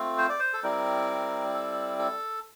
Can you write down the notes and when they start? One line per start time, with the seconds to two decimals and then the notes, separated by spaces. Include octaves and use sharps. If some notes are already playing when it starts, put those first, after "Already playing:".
Already playing: A3 C4 F4
0.18 C5
0.29 D5
0.40 C5
0.53 A4
0.63 G3 C4 E4 A#4
1.53 A4
1.99 A4